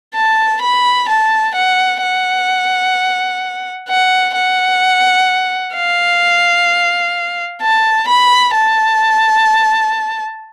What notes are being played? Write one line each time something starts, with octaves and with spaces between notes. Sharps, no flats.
A5
B5
A5
F#5
F#5
F#5
F#5
F5
A5
B5
A5